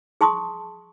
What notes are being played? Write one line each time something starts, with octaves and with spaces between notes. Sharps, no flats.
G#4 A5 C6 C#6 D#6